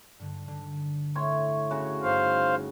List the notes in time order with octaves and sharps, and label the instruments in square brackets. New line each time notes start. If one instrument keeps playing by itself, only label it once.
[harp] G2 D3
D3
[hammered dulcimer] A2 C#5 C6
C#3 F#4
[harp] G1 G2 D#4 [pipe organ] C5 F5